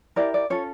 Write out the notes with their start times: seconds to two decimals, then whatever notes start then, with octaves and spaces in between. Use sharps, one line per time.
0.16 E4 G4 A#4 D5
0.34 D5
0.50 C#4 F4 A4 C#5